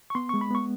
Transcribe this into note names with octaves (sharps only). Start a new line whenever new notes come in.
C#6
B3 C6
G#3 C#6
B5
B3 C#6